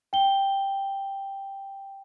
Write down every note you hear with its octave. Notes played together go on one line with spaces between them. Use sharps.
G5 G7